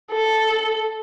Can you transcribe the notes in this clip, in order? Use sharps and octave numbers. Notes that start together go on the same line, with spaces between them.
A4